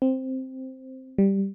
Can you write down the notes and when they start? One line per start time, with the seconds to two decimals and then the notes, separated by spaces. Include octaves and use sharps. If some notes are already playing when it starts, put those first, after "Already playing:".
0.02 C4
1.18 G3